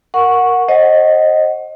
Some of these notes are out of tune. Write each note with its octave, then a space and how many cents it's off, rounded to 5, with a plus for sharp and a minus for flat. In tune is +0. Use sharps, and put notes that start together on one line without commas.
A#4 +0 F#5 -15 C#6 -5
C5 +30 D#5 +0 F#5 +0